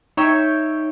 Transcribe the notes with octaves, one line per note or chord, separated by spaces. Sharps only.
D#4 C#5 E5 G5